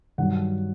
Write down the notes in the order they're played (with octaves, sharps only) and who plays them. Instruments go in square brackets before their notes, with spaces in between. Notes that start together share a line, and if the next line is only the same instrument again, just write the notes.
[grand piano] G2 D#3 F#3 F#5